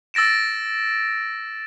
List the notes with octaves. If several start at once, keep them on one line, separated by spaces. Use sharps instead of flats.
E6 A6 A#6 D7 E7